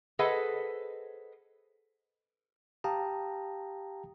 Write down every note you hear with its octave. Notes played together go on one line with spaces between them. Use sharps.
G#4 A4 B4 C5 D#5 F#5
G4 F5 G5 A5 A#5 D#6